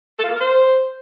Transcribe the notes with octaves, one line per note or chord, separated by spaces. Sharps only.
A4
F4
A#3
A#4
C5